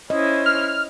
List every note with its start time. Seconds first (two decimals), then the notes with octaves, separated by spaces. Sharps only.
0.10 C#4 E4 C5 D#5
0.46 F6